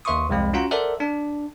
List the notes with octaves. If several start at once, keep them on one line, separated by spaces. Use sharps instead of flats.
D#2 B4 E5 C6 C#6 D#6
C2 F2 G#3 B5
C#4 F4 F#4 F#5 A#5
A4 A#4 C5 D5 E5 F#5
D4